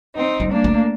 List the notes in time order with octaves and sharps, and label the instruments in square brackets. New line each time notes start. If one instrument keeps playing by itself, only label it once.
[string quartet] C4 D#4
[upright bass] G3
[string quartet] A#3 D4
[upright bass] A3